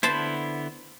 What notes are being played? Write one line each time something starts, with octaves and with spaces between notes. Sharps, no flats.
D3 B3 E4 C5 A5 B5